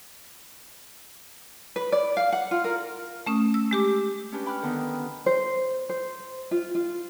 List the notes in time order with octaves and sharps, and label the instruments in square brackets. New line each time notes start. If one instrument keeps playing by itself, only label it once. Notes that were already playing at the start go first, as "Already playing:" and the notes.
[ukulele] B4
D5
F5
F#5
F4
A#4
[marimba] A3 C#4 D#6
E6
G#3 G4 D6
[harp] C#4 D4 G4 B4
G5 B5 D6 F6 F#6
D3 D#3 B3
[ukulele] C5
C5
F4
F4